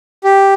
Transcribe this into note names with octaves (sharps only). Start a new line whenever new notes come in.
G4